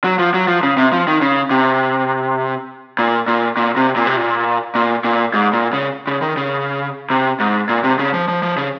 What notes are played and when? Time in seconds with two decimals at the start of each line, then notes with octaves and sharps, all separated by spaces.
0.04 F#3
0.19 F3
0.34 F#3
0.48 F3
0.63 C#3
0.77 C3
0.92 F3
1.07 D#3
1.21 C#3
1.51 C3
2.99 A#2
3.28 A#2
3.57 A#2
3.77 C3
3.96 A#2
4.07 C3
4.16 A#2
4.75 A#2
5.04 A#2
5.34 G#2
5.53 A#2
5.73 C#3
6.07 C#3
6.22 D#3
6.37 C#3
7.10 C3
7.40 G#2
7.69 A#2
7.84 C3
7.99 C#3
8.14 F3
8.28 F3
8.43 F3
8.57 C#3